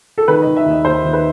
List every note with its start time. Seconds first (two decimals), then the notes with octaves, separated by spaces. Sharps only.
0.18 A4
0.28 D#3 B4
0.42 D#5
0.47 D#3
0.56 E5
0.66 D#2 D#5
0.85 D#2 C5
1.04 D#3
1.13 B4